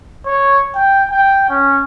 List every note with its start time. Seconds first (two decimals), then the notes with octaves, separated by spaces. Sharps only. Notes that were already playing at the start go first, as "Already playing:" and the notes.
0.26 C#5
0.75 G5
1.10 G5
1.49 C#4